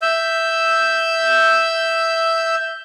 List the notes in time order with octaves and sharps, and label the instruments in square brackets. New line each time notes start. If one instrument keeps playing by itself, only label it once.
[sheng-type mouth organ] E5 E6 G6